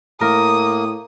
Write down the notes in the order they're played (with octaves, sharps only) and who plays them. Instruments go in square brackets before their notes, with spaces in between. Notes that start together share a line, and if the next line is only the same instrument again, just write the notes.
[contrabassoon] A2 [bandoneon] A#3 [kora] A#4 [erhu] D#6